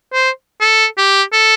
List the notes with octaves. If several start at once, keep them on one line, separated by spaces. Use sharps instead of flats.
C5
A4
G4
A4